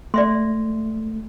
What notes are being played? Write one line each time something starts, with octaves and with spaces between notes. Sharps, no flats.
A3 D5 E5 C6